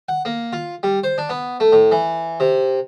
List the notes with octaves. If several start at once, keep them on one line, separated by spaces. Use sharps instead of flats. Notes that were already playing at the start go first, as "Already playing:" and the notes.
F#5
A#3
F4
G3
C5
D4
B3
A3
A2
E3
C3